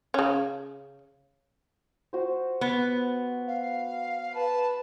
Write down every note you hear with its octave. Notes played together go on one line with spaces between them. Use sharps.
C#3 C#4
F#4 C5
B3
F5
B4 A5